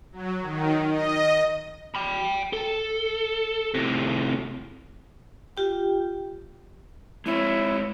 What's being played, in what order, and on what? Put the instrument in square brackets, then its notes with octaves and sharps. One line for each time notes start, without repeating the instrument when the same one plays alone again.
[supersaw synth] F#3
D#3
D#5
[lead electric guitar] G5 B5
A4
A2 C3
[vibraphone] F4 G4 G5
[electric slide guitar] G#3 C4 C#5 [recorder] E4